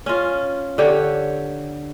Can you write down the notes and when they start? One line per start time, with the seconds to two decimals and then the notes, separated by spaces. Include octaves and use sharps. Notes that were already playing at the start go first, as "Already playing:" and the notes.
0.06 C#4 F4
0.78 D3 G4 C#5